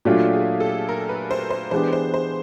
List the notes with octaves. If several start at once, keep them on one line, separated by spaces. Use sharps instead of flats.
A#2 F#3 A3 D4 F4 G4
G#4
A4
A#4
B4
C5
C5
E3 G#3 B3 D4 G4 C5
C5
C5